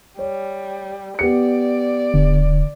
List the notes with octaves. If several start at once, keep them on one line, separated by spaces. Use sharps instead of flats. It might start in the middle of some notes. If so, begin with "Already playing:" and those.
G3 C#5
B3 G4 D5 C#7
D#1 D3